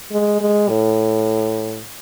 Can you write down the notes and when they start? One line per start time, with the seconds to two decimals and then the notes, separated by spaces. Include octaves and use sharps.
0.11 G#3
0.41 G#3
0.69 A2